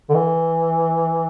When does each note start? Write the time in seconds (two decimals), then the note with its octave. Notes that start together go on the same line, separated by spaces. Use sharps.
0.09 D3
0.14 E3